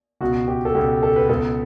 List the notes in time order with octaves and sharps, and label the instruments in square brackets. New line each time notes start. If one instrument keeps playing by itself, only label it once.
[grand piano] C#2 B2 F#4
G4
A4
C#2 B2 G4
A4
B4
C#2 B2 A4